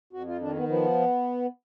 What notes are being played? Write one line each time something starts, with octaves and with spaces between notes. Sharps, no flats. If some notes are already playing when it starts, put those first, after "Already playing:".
F2 F#4
F4
D#3 D4
B3
F3 B3